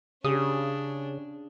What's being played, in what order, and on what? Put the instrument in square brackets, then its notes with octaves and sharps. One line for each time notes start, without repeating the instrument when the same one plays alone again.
[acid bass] C#3 [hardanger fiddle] C#4 D4 [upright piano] G4 G#4 [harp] D#6